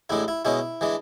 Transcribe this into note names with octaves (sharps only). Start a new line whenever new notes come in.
A1 A2 G#3 D4 E4
E4
B2 G#3 C#4 E4
E3 G#3 D4